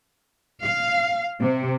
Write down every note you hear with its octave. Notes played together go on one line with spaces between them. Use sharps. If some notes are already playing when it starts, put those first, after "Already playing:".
F5
C3